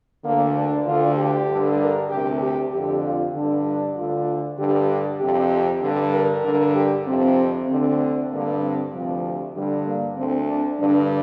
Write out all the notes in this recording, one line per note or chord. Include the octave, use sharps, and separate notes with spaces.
D2 D3 A#3
D4
D2 D3 F4
G4
G2 D3
A#4
D2 C3 G4
G4
F2 D3 G4
F4
G2 D3 D4
D4
D2 D3 F4
G2 D3 G4
F2 C3 G4
G2 D3
A#4
G2 D3
G4
F2 C3 C4
D2 D3 C4
G2 D3 A#3
C4
D2 C3 F3
G2 D3 G3
A#3
D2 D3 C4
D4
G2 D3 D4